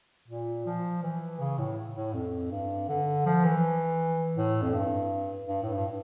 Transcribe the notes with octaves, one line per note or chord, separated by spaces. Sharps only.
A#2
F3
E3
C#3
A2
A2
F2
G2
D3
F3
E3
A2
F2
G2
G2
A2
G2